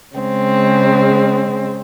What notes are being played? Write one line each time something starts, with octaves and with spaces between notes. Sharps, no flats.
C#3 G#3 C4